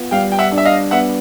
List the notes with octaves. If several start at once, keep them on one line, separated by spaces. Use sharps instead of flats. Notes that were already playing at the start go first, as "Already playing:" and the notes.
Already playing: B3 F4
G3 F5 G5
G5
E5 F#5
D4
E5
D#5 F5
B3 E5 F#5